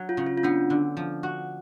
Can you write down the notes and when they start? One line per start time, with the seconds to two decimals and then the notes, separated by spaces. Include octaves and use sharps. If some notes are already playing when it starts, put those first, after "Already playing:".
Already playing: F#3
0.09 F4
0.17 C#3
0.26 F4
0.38 F4
0.43 B3 D4
0.70 D3
0.97 F3
1.23 F#4